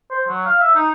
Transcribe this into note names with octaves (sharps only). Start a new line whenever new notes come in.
C5
F#3
F5
E5
D#4